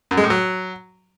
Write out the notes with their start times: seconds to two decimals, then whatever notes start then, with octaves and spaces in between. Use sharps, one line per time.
0.11 F#2
0.17 G#3
0.24 A2
0.30 F#3